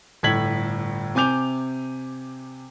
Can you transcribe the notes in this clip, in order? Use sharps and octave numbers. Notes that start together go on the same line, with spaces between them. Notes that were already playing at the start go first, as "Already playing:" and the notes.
G1 A2 G#6 B6 F#7
C3 G#5 D6 G6 F7